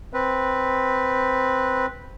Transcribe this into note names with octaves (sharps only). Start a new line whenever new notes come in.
C4 B4